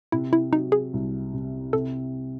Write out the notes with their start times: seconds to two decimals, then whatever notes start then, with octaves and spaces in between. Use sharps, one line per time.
0.12 C3 E4
0.33 E4
0.52 F#3 D#4
0.72 G#4
0.93 C2
1.34 C3
1.73 C3 A4